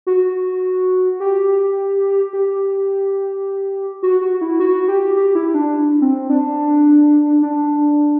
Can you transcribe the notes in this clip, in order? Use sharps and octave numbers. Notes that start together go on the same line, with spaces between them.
F#4
G4
G4
F#4
F#4
E4
F#4
G4
G4
E4
D4
C4
D4
D4